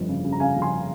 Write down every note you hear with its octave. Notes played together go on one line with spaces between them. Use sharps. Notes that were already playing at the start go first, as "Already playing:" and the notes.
Already playing: G1 F2
C#3
C#3
A#5
C#3 F5 G#5
F2
G#5 C6